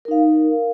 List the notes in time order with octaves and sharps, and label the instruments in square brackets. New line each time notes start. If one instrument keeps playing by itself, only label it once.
[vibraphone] A#4
D#4
F5